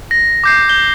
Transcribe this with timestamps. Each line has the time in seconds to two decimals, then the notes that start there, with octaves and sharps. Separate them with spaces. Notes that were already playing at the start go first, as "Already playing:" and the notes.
0.11 A#6
0.44 D6 G6 C7
0.69 G6 G7